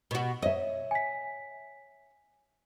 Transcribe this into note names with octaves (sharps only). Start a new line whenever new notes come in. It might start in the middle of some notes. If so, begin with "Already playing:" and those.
B2 F#4
C#5 D#5 E5
G#5 B6